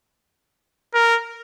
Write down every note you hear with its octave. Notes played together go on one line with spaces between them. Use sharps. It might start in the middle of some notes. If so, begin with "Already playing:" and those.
A#4